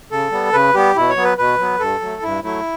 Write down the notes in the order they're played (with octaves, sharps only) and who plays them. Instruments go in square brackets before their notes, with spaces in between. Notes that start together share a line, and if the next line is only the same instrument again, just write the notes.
[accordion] C#3 A4
G3 B3
C#3 B4
G3 B3 G4
B2 E4
C#5
F#3 B3
B4
B2 B4
F#3 B3
G2 A4
F#3 A3
G2 E4
F#3 A3 E4